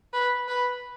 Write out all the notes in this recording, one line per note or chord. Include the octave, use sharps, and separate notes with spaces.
B4
B4